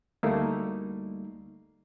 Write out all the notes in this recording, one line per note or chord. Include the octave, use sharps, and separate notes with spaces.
D2 G3 A3 A#3 D#4